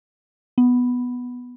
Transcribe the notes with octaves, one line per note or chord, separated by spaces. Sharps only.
B3